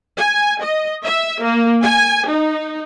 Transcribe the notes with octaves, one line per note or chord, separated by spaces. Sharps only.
G#5
D#5
E5
A#3
G#5
D#4